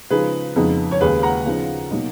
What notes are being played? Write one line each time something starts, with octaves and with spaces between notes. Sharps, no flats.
C#3 F3 G#3 D#4 G#4 B4
F2 C#3 G#3 B3 D#4
C#5
D#2 C#3 G#3 G#4 B4
F#5 A#5
C#3 F3 B3 D#4
B2 F#3 A#3 D#4